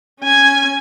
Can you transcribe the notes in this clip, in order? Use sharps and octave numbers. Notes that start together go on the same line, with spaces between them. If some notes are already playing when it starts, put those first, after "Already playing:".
C#4 G#5